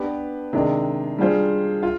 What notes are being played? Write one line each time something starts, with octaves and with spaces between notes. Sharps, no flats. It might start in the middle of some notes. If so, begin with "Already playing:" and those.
Already playing: B3 D4 G4 B4
C3 D#3 G#3 D4
G3 D4 F4 G#4 C5
F4